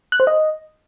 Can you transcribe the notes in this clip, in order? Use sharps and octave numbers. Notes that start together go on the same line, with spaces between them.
F#6
C5
D#5